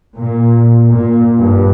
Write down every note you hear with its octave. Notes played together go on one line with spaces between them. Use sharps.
A#2
A#2
G2